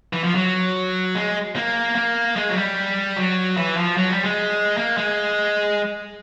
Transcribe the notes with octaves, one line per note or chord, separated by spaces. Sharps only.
E3
F3
F#3
G#3
A#3
A#3
G#3
F#3
G3
F#3
E3
F3
F#3
G3
G#3
A#3
G#3